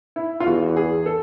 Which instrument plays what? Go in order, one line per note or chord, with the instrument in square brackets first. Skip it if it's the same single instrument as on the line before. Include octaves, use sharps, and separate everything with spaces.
[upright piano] E4
F4
[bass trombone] E2 [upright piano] F#4
[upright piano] G#4
A4